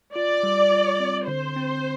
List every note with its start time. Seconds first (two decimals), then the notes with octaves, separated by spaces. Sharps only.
0.16 F4 D5
0.43 G3
0.72 F4
1.00 C4
1.28 D3 C5
1.56 C4